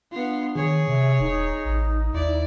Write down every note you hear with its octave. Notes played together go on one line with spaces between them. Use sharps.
B3 D4 F4
D#3 G#4 C#5
C3 E5
E1 D#4
A1
D#2 E4 D5